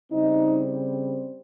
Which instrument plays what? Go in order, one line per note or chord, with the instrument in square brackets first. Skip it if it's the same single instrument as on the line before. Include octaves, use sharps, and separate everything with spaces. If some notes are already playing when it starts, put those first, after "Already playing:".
[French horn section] C#3 G3 C4 D#4